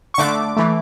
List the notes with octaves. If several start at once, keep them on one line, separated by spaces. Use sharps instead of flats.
C#6
D3 A3 D4 D6
E3 A3